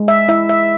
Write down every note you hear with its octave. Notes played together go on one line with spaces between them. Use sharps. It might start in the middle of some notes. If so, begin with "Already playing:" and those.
Already playing: G#3
E5
E4 E5
E5